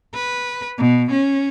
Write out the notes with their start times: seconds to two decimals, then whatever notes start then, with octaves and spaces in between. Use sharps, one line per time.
0.14 B4
0.78 B2
1.11 C#4